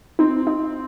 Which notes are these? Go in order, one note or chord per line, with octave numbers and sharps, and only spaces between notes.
C4 D#4
D#4